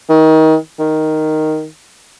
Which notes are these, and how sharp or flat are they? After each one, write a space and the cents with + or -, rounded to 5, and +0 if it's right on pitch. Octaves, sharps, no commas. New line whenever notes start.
D#3 +25
D#3 +0